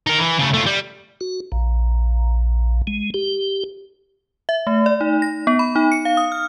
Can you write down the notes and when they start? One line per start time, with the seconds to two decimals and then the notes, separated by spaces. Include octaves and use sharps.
0.07 D#4 A#4
0.18 E3
0.39 C#3 A3
0.54 A3 F4
0.66 G3
1.21 F#4
1.52 A#1
2.87 G#3
3.14 G4
4.49 E5
4.67 A3
4.86 D5
5.01 D#4
5.22 A#6
5.47 B3
5.59 B5
5.76 D#4
5.92 C#7
6.05 F5
6.17 D#6
6.32 F6